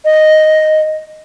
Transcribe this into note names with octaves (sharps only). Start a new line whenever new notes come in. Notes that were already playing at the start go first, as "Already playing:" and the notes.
D#5